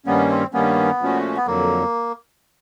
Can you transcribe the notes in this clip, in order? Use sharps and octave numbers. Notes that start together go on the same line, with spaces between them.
G2 D#3 G3 A#3 B3 C#4
C4
G2 D#3 G3 A#3 B3 C#4
A#2 F3 A3 C#4 F#4
B3
F2 D3 F#3 A#3